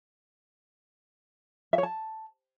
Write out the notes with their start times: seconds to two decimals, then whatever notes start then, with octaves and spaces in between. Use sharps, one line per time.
1.73 E5
1.78 C#5
1.83 A5